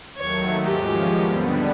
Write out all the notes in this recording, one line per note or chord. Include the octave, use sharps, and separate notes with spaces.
D#2 D#3 F#3 A3 C#5
G#2 F3 G#3 C#4 G4
D#2 D3 G3 B3